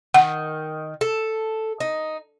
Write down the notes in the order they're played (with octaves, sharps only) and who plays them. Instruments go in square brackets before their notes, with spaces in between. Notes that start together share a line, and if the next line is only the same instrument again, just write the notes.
[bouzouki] D#3 [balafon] F#5
[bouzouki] A4
D#4